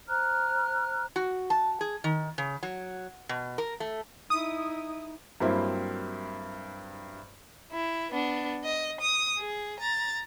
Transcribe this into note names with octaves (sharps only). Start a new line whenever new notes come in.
C5 A#5 F6 F#6
F#4
A5
G#4
D#3
C#3
F#3
B2
A#4
A3
D#4 E4 D#6
G2 F#3 A#3 C4 E4
E4
B3 D4
D#5
D#6
G#4
A#5 A6